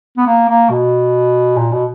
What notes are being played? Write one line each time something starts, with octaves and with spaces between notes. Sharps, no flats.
B3
A#3
A#3
B2
A#2
B2